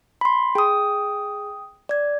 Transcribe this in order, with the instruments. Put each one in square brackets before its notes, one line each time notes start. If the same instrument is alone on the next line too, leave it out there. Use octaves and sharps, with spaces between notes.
[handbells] B5 C6
[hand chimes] G#4 [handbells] G5 D#6
[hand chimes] D5 G#6